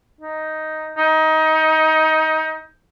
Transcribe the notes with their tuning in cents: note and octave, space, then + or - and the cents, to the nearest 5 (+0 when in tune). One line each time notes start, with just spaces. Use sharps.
D#4 +5
D#4 +20